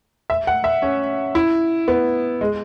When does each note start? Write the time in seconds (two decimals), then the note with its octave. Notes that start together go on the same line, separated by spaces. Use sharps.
0.30 E5
0.47 F#5
0.64 E5
0.82 C#4
1.35 E4
1.88 B3
2.41 G#3